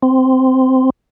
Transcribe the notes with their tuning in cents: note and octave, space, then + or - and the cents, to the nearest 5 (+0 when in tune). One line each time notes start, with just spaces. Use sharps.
C4 -10